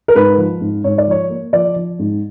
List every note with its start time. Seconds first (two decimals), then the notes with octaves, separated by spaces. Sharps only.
0.08 A#4
0.15 G#2 B4
0.38 F3
0.61 G#2
0.84 G#2 C#5
0.98 D5
1.07 F3 C#5
1.30 A#3
1.53 F3 D5
1.76 F3
1.99 G#2